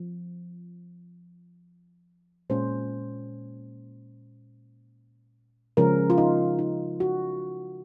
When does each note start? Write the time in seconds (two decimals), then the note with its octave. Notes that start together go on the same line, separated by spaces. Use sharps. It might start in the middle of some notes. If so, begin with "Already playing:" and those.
Already playing: F3
2.50 A#2 G#3 C#4 C5
5.77 C#3 F3 G#3 C#4 A#4
6.10 F4
6.18 D#4
6.59 D#4
7.00 F#4